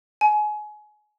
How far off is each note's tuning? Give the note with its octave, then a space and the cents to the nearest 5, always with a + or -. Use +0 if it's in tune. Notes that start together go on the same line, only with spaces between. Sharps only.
G#5 +25